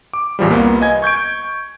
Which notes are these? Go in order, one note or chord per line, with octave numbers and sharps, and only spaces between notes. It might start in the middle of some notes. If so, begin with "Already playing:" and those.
D6
A1 E2 F3 G3
C2 A#3 B3
D#5 G#5 G#6
C#6 G6 G#6 D7